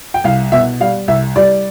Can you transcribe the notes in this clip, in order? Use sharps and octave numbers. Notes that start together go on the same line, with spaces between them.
G5
C2 F5
B2 E5
G3 F5
C2 E5
G3 D5